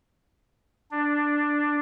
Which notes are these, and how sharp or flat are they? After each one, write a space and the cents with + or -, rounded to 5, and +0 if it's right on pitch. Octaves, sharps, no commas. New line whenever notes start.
D4 +5